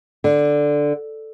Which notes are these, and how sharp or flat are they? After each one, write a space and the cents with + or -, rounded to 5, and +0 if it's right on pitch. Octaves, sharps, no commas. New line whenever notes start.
D3 +0